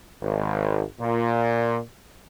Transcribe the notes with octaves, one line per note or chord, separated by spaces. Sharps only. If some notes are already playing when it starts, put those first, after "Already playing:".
G#1
A#2